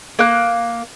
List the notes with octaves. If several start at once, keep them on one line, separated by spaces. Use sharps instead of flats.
A#3 F#6